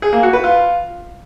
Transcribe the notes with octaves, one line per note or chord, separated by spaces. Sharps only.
G#4
A#3
F#4
B4
F4